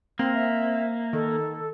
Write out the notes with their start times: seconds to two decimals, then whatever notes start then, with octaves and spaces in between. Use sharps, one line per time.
0.19 A#3 C4
0.34 E5
1.13 D#3 A4